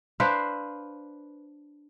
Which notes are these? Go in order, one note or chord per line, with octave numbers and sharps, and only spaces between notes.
D4 B4 C5 F5